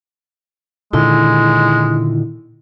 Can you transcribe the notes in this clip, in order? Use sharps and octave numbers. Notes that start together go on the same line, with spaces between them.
A#2 D3 D#3 G#3 E4